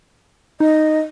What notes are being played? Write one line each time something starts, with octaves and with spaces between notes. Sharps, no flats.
D#4 D#5